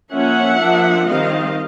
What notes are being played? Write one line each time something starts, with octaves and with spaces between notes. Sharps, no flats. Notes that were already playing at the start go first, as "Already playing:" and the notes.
F3 A#3 C#4 E5 F#5
F3 A#3 D4
D#3 G3 C4 D#5 F5